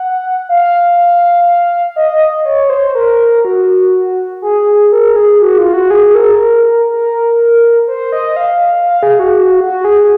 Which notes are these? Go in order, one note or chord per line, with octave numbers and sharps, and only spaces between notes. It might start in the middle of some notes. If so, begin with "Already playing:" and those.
Already playing: F#5
F5
D#5
C#5
C5
A#4
F#4
G#4
A#4
G#4
F#4
F4
F#4
G#4
A#4
A#4
C5
D#5
F5
F5
G#4
F#4
F#4
F#4
G#4